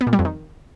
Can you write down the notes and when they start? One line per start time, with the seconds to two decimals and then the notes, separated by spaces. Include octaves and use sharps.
0.01 B3
0.07 A#2
0.13 G3
0.19 F2
0.25 D#3